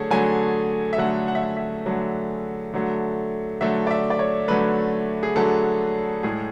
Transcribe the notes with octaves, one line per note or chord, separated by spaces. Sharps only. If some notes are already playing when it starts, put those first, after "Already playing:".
Already playing: D3 F#3 A3 G#4 A4 C#5
D3 F#3 A3 G#5
E5
D3 F#3 A3 F#5
F#5
E5
F#5
E5
D3 F#3 A3
D3 F#3 A3
D3 F#3 A3 E5
D5
E5
D5
C#5
D3 F#3 A3 B4
G#4
D3 F#3 A3 A4
A2 G#3 G#4